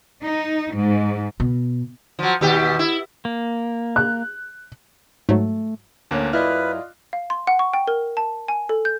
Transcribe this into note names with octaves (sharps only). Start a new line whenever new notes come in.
D#4
G#2
B2
F3 F#3
D#2 B2 G4
E4
A#3
F#6
G#2 F#3 A3
D2 D3 A#3 C#4 F#6
F#2 E4 F4 B4 D5 D#5 F6
F5
C6
F#5
C#6
G5
A#4
A5
G#5
A4
G6